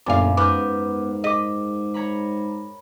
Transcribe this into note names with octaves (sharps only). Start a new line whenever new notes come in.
G1 F#2 A#2 E5 F5 G#5 D6
G#2 B3 A#4 D6 F6 G6
G#4 D#5 D6 B6
C#5 A#5 B5